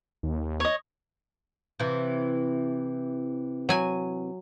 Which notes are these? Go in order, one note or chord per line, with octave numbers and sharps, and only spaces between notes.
D#2
C#5 D#5
C3 E3
F#3 G#5